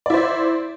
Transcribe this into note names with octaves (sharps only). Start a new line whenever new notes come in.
E4 C5 D5